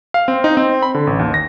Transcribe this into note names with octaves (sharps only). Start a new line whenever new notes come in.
F5
C4
D#4
C4
B5
D3
A1
D#2
A#6